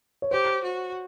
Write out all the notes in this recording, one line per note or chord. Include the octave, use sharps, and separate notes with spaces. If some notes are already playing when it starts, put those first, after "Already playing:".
C#5
G4 C5
F#4